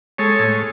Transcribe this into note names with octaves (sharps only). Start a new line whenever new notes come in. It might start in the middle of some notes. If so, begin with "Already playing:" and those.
G#3 A4 C#5
A2